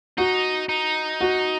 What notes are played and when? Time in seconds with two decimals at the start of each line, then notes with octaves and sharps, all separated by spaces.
0.18 D#4 F#4
0.69 D#4
1.21 F#4